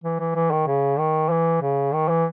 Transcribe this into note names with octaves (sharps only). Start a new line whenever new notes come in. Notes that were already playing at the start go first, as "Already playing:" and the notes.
E3
E3
E3
D#3
C#3
D#3
E3
C#3
D#3
E3